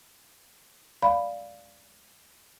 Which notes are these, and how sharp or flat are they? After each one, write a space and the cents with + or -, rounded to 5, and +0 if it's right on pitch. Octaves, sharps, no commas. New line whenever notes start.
D5 -5 F5 +0 B5 +0